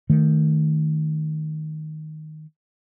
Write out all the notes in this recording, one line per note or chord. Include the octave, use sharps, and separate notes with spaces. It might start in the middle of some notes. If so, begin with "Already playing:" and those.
D#3 A3